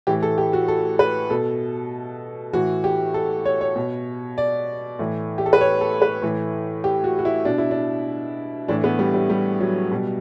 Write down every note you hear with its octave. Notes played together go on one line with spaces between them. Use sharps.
A2 E3 G4
A4
G4
F#4
A4
B4
B2 A4
A2 E3 F#4
G4
A4
C#5
C#5
B2
D5
A2 E3
G4
A4
B4
C#5
A4
B4
A2 E3
G4
F#4
F#4
E4
B2 D4
E4
D4
A2 E3 D4
B3
G3
G3
G3
F#3
B2 G3